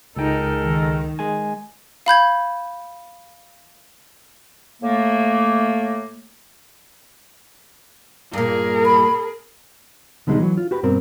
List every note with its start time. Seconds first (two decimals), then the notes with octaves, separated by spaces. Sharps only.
0.17 C#2 G#3 D#4 A4 A#4 G5
0.60 D#3
1.19 G#3 G#5
2.06 F5 B5 G6 G#6
4.82 A2 A3 A#3
8.33 G2 A#2 G#4 A#4
8.85 B5
10.27 B2 D3 G3 G#3 D#4
10.39 E3 F#3
10.57 F4
10.71 F#4 G4 B4
10.83 G2 B2 C4 A#4